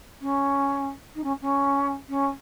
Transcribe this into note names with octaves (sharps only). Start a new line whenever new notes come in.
C#4
D#4
C#4
C#4
C#4